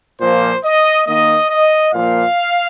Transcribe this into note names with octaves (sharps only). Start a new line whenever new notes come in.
A#2 F3 A#3 C5
D#5
D#3 A#3 D#5
D#5
A#2 F3 A#3 F5